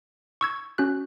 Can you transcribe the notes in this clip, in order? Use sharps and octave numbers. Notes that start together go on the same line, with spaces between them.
C#6 E6 G#6
C#4 F#4 F#6